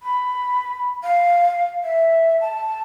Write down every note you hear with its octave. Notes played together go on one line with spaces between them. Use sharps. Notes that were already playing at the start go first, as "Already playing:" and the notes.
B5
F5
E5
A5